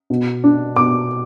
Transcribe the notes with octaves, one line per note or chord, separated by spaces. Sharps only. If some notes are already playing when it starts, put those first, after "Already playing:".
B2
D4
B2 D6